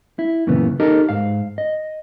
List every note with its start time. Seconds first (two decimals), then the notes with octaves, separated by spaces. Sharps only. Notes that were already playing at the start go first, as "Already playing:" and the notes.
0.19 E4
0.47 F#2 A#2 C#3 E3 B3
0.80 D#4 G4 A4 A#4 D#5
1.09 G#2 F5
1.58 D#5